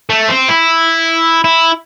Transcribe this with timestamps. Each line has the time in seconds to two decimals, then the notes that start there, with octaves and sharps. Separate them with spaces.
0.10 A3
0.28 C4
0.49 E4
1.44 E4